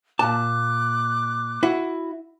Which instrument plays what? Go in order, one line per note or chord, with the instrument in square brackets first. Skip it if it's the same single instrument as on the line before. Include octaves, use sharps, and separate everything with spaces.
[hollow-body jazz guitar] A#2 A5 [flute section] D6 F#6
[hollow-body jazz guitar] E4 F#4